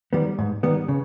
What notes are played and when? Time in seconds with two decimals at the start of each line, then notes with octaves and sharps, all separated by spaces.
0.13 D#3 G3 B3
0.39 G#2
0.63 D#3 G3 B3
0.88 C#3